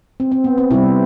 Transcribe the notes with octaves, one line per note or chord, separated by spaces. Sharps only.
C4
C4
B3
C4
C3 G3 C4 E4